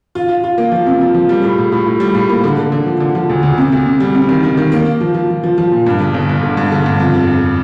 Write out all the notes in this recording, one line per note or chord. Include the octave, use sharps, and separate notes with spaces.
F4
F4
F4
A#3
F3
C3
F3
F3
G3
A2
A2
A2
A2
G3
A2
A#3
D3
D3
D3
F3
D3
F3
D2
D2
C3
D2
C3
G3
C3
D#3
D#3
D#3
A#3
A#3
F3
F3
F3
F3
F3
A#2
G2
G1
G1
G1
D3
G2
D3
G2
F2
F1
F1